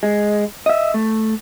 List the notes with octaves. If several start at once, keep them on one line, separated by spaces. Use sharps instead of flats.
G#3
D#5 E5
A3